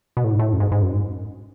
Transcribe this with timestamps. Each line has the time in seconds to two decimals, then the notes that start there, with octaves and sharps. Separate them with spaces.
0.17 B2
0.24 A2
0.32 G#2
0.39 A2
0.53 F#2
0.60 G#2
0.72 G#2
0.82 F#2
0.93 G#2